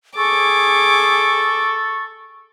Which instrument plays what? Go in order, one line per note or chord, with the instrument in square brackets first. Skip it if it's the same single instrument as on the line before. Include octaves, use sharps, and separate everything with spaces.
[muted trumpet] G#4 [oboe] A4 [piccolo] C#6 [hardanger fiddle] D6